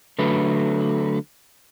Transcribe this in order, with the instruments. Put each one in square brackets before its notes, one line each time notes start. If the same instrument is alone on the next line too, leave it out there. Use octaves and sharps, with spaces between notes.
[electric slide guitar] D3 F#3 A3 B4